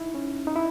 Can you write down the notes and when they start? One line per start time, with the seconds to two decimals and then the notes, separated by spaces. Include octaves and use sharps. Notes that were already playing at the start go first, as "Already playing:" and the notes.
Already playing: D#4 E4
0.15 C#4
0.47 D#4
0.56 E4